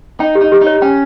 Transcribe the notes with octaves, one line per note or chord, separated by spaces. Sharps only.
D#4 G5
G4
D#4
G4
D#4
C#5
C#4 G5